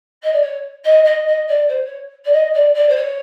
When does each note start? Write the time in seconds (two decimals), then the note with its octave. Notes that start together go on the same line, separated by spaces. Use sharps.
0.23 D#5
0.32 D5
0.41 C#5
0.84 D#5
1.04 D#5
1.27 D#5
1.47 D5
1.68 C5
1.84 C#5
2.24 D5
2.32 D#5
2.53 D5
2.74 D5
2.89 C5
2.96 C#5